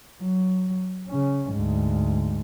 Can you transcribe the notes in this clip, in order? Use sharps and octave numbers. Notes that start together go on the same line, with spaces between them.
F#3
C#3 C#4
D2 G#2